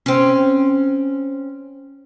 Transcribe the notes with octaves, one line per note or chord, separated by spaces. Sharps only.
C4 C#4